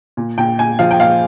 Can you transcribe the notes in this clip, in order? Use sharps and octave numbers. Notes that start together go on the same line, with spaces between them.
A#2
A#2 G5
A#2 G#5
F3 F5
G5
A#2 F5